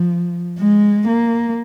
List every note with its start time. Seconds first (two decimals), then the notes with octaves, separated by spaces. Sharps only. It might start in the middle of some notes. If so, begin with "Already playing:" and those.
Already playing: F3
0.59 G#3
1.08 A#3